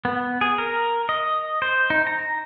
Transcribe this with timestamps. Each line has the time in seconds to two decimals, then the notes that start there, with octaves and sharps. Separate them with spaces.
0.05 B3
0.41 G#4
0.58 A#4
1.09 D#5
1.62 C5
1.90 D#4
2.07 A#5